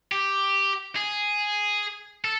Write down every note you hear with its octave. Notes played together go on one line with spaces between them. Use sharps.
G4
G#4
A4